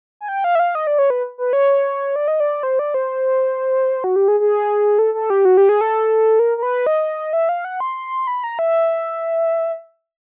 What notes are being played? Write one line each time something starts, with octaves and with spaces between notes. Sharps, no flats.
G#5
G5
F5
E5
F5
D#5
D5
C#5
B4
B4
C#5
D5
D#5
D5
C5
D5
C5
F#4
G4
G#4
G#4
A4
A4
G4
F#4
G4
G#4
A4
A#4
A#4
B4
D#5
E5
F5
F#5
C6
B5
A#5
E5